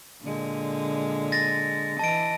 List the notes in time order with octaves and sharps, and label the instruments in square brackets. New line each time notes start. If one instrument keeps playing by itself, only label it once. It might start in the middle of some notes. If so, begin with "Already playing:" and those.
[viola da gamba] A#2 D3 G#3
[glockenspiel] A6 A#6
[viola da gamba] E3 D#5 [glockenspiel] A5 D7